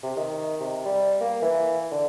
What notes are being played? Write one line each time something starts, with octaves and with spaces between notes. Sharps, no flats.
C3
D#3
C3
G3
A#3
E3
D3